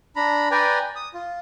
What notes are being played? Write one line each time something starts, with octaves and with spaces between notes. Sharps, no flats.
D4 A#5 B5
B4 D5 G5 G#5 A#5
D#6
F4